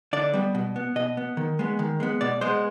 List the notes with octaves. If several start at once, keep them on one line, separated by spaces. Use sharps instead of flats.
D3 D5
G3 B3
B2
B3
B2 D#5
B3
D#3
G#3 B3
D#3
G#3 B3
B2 D5
G#3 B3 C5